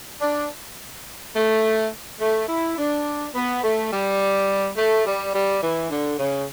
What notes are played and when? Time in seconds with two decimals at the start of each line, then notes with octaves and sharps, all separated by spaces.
0.21 D4
1.35 A3
2.19 A3
2.48 E4
2.76 D4
3.34 B3
3.63 A3
3.91 G3
4.77 A3
5.05 G3
5.33 G3
5.61 E3
5.90 D3
6.19 C#3